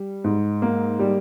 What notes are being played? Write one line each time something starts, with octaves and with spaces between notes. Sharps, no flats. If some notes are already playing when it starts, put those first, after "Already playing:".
Already playing: G3
G#2
A#3
G3